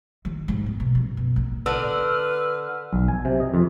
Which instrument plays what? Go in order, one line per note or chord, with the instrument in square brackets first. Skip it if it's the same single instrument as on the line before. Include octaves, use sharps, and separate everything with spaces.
[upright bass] D#3
G#2
B3
B2
F#2
B2
A#1
[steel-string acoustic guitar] D3 [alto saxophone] B4 [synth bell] E6 [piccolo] F6
[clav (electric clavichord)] B1
G#5
C3
D#5
F2